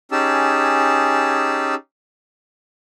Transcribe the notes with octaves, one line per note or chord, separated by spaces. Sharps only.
C#4 D#4 G4 G#4 A5 E6